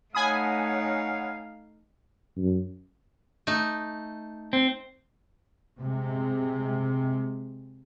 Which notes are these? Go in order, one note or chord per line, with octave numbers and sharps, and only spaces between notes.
A3 D#4 C#5 F5 F#5 G#5 B5 D#6
F#2
A3 D#4
C4
C3 G#3